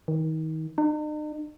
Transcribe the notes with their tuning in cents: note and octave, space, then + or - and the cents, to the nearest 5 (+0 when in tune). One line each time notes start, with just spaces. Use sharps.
D#3 +30
D#4 -45